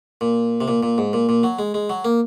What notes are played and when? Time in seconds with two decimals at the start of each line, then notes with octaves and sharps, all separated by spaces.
0.21 A#2
0.61 C3
0.68 A#2
0.83 A#2
0.98 G#2
1.13 A#2
1.29 A#2
1.43 F#3
1.59 G#3
1.74 G#3
1.90 F#3
2.05 A#3